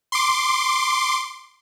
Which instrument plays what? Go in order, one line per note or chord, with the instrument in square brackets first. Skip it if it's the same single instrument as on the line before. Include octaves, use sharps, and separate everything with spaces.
[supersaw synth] C6 D6